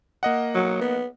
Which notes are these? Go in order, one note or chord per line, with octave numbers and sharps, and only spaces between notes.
A#3 D#5 F#5
F#3
B3